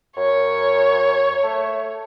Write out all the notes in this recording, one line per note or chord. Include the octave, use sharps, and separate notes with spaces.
F#2 C#5
A3